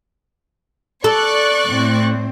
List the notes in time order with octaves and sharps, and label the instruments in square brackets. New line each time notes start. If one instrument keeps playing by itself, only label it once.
[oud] A4 [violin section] D5 C#6 F#6
[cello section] A2 C4